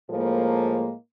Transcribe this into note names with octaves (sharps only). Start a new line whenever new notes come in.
A2 F3 G#3 A#3